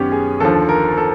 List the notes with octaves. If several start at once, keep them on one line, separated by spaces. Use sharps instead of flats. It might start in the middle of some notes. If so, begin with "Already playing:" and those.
Already playing: F#2 D#3 B3 C#4 G4
G#4
D#2 D3 F3 A4
A#4
A4